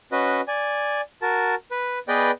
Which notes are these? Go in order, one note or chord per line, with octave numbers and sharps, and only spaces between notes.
C#4 F#4 B4 D#5
D5 G#5
F#4 A#4 A5
B4
B3 G#4 B4 D5 D#5 G5